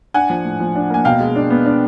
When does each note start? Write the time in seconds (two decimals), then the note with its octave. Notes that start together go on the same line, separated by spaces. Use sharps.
0.14 D4 F#5 G#5
0.30 F3
0.45 A2
0.60 F3
0.76 D4
0.90 A#3 G#5
1.05 B2 F5 G5
1.20 G#3
1.36 D4
1.50 B3
1.66 D4